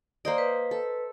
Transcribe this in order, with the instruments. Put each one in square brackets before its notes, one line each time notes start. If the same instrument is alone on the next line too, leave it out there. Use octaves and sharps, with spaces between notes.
[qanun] A#3 C5 D#5 [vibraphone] D5
[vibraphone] B4
[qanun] A4